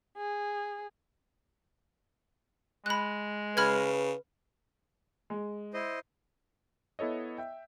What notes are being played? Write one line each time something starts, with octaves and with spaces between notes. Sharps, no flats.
G#4
G#3 B5 F#6
C#3 B4 B5 F6 G#6
G#3
E4 C5 D#5
B3 E4 A4 C#5 D#5
E5 G5